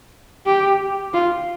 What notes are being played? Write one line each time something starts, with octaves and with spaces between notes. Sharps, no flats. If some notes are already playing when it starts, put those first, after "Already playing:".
G4
F4